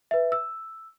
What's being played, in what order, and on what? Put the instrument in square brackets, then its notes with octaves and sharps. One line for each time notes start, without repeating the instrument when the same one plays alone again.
[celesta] B4 E5
E6